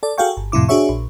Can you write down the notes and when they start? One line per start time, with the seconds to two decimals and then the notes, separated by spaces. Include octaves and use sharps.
0.03 A4 D5
0.18 F#4 G#4 A4 F5 G5 C#6
0.37 G1
0.52 F2 A2 C3 E4 D6
0.69 D4 F#4 G#4 C#5 E5 C#6
0.89 A#1